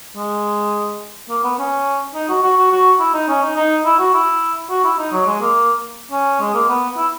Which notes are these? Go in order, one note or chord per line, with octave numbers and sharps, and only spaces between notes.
G#3
A#3
B3
C#4
D#4
F#4
F#4
F#4
F#4
E4
D#4
C#4
D#4
D#4
E4
F#4
E4
F#4
E4
D#4
F#3
G#3
A#3
C#4
G#3
A#3
B3
E4